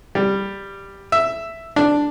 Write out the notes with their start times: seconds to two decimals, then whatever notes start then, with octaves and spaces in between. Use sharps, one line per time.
0.15 G3
1.12 E5
1.76 D4